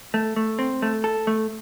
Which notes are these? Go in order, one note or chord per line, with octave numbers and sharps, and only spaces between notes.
A3
A3
C4
A3
A4
A3